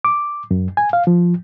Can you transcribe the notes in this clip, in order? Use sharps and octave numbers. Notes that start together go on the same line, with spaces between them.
D6
F#2
G#5
F5
F3